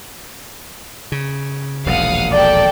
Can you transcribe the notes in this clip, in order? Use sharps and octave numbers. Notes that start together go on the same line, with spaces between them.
C#3
E1 A#1 D#2 F5 F#5 D#6
A4 D5 G5 A5